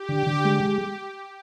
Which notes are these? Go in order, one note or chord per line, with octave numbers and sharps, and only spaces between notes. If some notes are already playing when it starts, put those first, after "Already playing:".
Already playing: G4
D3
D3
G#3